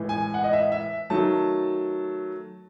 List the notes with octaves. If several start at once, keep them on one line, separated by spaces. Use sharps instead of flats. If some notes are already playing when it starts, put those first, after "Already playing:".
Already playing: A2 E3 G#3
G#5
F#5
D#5
E5
E5
D#3 F#3 A3 A5